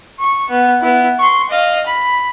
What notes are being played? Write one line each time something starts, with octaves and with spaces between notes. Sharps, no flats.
C#6
B3
B3 E4
C6 C#6
D#5 F5
B5